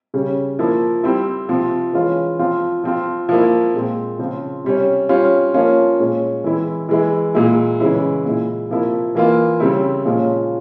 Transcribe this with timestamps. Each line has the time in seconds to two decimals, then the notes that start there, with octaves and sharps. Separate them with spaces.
0.14 C#3 G3 C#4
0.59 F3 A#3 E4
1.04 G3 C4 E4
1.49 C3 F3 C4 F4
1.94 E3 G#3 C#4 F4
2.39 F3 C4 F4
2.84 F3 C4 F4
3.29 F3 A#3 E4
3.74 A#2 G#3 C4
4.19 C#3 F3 C4 F4
4.64 C3 G3 C#4
5.09 G3 C#4 F4
5.54 F3 A#3 C#4 F4
6.00 A#2 G#3 C#4
6.44 E3 G#3 C4 E4
6.89 E3 G#3 E4
7.35 A#2 G#3 E4
7.80 C#3 E3 G#3 C#4 E4
8.25 A#2 G#3 E4
8.69 C3 F3 A#3 E4
9.15 E3 A#3 F4
9.60 C#3 G3 C4 E4
10.05 A#2 F3 G#3 C#4 F4